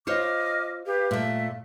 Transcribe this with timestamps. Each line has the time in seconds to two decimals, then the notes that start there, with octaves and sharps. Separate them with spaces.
0.07 F4 C5 C#5 D#5 D6 F6
0.86 G4 B4 F5
1.11 A#2 A3 E5